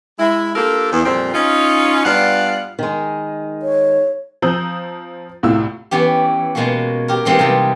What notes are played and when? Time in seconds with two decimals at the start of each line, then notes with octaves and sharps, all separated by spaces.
0.19 G#3 E4
0.55 A#3 D4 F4 G4 A4 A#4
0.92 E2
1.05 F2 A#2 G3 C4
1.34 C#4 D#4 F4
2.05 G2 B3 F4 D5 F5 F#5
2.79 D#3 G#3
3.62 C#5
4.42 F3 C4 A#5 D#6 E6 G6
5.43 C2 A2 F4 E6
5.91 E3 B3 C#4 G4
6.55 B2 G#3 A#3 C#4 F#4
7.08 G4 A#4
7.25 E3 G#3 C4 D#4 F4 G4
7.39 C3 G3 G#3 B3